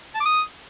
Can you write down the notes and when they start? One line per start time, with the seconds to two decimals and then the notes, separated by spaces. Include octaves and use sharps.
0.15 A5
0.20 D6
0.25 D#6